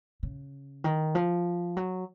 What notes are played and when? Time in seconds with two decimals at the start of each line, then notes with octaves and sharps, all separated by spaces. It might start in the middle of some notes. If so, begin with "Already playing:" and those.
0.23 C#3
0.84 D#3
1.15 F3
1.77 F#3